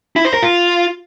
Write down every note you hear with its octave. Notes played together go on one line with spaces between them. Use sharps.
E4
C5
A#4
F4